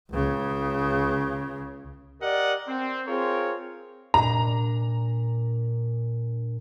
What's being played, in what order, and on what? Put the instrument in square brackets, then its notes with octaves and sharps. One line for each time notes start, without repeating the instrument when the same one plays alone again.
[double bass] C#2 C#3
[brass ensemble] G4 A#4 D5 D#5 F#5
C4
C4 F4 G#4 A#4 C#5
[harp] A#2 D4 [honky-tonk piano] A#5